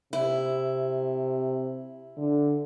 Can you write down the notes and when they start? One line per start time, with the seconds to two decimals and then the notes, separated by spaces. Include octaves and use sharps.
0.13 C3 E4
2.17 D3